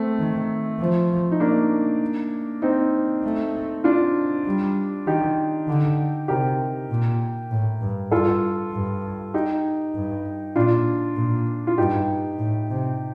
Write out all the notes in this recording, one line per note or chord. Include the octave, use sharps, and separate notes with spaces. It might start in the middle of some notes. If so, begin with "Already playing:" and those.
Already playing: A3 C4
D#3
F3
D#4
A#3 D4
C4 D#4
A3
D4 F4
G3
D#3 D#4 G4
D3
C3 G4 A#4
A#2
A2
G2
G2 F4 A4
G2
D#4 G4
G2
A#2 D4 F4
A#2
F4
G2 D#4 G4
A2
C3